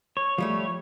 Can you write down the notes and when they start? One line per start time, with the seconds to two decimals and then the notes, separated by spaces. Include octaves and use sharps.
0.17 C#5
0.38 F3 G3 A3